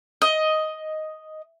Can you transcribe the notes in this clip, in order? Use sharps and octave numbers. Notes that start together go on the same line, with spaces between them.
D#5